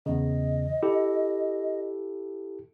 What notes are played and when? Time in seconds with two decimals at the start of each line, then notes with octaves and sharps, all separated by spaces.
0.06 E2 C#3 D#5
0.83 E4 G4 A4